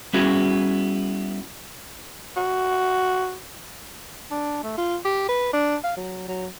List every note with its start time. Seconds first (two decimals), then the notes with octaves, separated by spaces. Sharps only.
0.13 G3 B3 C#4 E4 F#4 G#4
2.37 F#4
4.31 D4
4.63 A3
4.77 F4
5.05 G4
5.28 B4
5.53 D4
5.84 F5
5.97 F#3
6.28 F#3